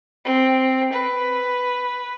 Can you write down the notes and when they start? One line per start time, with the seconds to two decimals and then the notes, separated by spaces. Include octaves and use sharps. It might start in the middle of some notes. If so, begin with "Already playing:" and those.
0.24 C4
0.93 B4